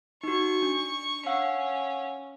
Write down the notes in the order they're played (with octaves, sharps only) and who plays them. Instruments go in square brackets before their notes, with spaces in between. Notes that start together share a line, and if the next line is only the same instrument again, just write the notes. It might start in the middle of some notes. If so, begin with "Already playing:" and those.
[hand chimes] D#4 F#4 [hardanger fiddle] C#6
[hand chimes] D4
[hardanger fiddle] C#4 [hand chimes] F5 F#5 E6